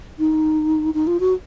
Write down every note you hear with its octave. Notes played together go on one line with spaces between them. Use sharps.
D#4
D#4
F4
F#4